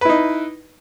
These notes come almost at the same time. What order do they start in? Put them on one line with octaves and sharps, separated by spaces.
B4 E4 D#4